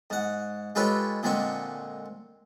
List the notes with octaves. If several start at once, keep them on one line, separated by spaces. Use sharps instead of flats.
G#2 F#5
G#3 F4 G4 A4 B4 C#5
A#2 D3 G#3 C4 C#6